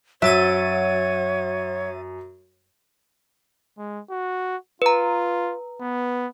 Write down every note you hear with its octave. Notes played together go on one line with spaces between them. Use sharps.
F#2 F#3 C#5 E5 A6 D#7
G#3
F#4
F4 B4 A#5
B3